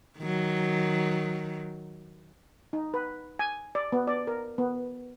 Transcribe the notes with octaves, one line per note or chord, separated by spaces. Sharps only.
D#3 F#3
D#4
B4
G#5
D5
B3
D5
A#4
B3